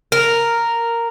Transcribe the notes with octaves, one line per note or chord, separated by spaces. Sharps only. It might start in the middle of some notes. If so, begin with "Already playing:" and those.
A#4